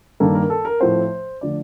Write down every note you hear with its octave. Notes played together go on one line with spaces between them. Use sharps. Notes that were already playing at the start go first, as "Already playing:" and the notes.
G2 D#3 A#3 D4 A4
A#4
A4
A#4
A2 F3 A3 C4 C5
D3 F3 A3 D5